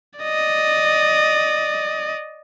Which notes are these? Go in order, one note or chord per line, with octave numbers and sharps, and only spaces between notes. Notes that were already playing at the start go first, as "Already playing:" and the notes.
D5 D#5